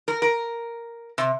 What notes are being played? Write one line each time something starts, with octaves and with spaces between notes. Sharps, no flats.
A#4
A#4
C3